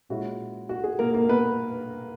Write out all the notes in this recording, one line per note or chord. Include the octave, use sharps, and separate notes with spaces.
A#2 G#3 C#4 E4 F#4
F#4
G#4
A#3 A#4
A#3 A#4
B3 B4